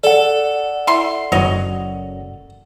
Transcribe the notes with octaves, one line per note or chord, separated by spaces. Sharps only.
A4 D5 F#5
E4 C6
F#1 F#2 F#4 C#5 D#5